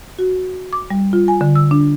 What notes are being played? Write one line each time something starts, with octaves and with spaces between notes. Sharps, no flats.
F#4
D6
G3
F4
G#5
D3
E6
D4